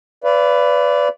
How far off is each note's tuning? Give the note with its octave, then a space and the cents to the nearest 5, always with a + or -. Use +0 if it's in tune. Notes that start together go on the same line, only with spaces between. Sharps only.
B4 +15 D5 -20 F5 -40